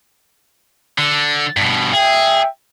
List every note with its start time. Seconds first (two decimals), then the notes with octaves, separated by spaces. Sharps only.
0.98 D3
1.57 G2 B2
1.93 G#4 E5 G5